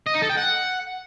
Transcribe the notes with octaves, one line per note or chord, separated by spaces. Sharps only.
D#5
D#4
A4
G5
F#5